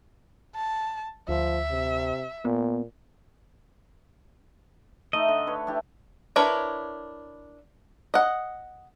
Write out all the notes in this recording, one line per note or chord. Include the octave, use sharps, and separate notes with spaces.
A5
D2 F3 E5
C3
A#2 B3
A3 D#4 D#5
D3
B4 C#5 B5
D4 E4 G4
D4 E4 A#4 B4 C#5
D#5 F#5